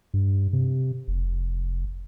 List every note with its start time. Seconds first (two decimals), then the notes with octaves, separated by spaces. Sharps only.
0.14 G2
0.53 C3
1.08 F1